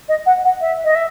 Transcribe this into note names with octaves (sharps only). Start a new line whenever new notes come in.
D#5
F#5
F#5
E5
D#5
E5